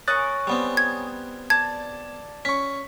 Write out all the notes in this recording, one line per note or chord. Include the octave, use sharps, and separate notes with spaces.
C#4 A#4 C#6 D#6 F#6 A6
G3 B3 C4
G#6
D5 A5 G#6
C#4 C#6 B6